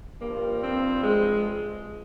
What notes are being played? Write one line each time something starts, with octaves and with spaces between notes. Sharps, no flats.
G2 A#3
F3
C4
G#3